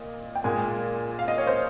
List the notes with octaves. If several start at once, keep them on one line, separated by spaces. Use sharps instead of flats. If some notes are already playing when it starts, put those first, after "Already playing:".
Already playing: A#2 D#5
G5
A#2 G#3 G#5
F5
D#5
C#5
C5